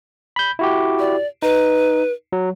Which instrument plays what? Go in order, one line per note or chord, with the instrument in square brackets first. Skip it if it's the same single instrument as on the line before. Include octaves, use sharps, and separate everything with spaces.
[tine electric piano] B5 G6
E4 F#4 G4
[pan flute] D5
[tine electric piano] D#4 [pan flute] B4
[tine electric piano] F#3